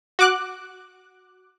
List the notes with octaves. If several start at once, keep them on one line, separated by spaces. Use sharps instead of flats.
F#4 D6 F#6